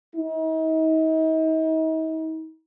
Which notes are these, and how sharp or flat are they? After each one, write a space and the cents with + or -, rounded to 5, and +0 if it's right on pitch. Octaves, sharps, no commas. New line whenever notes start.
D#4 +40